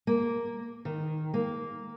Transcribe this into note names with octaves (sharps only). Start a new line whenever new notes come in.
A#3
D#3
A#3